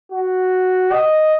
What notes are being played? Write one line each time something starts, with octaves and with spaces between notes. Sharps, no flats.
F#4
D#5